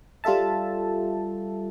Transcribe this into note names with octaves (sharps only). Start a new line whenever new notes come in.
G3 F4 A4 E5 A5